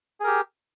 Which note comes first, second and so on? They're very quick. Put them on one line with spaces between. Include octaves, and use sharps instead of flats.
G#4 A#4 G4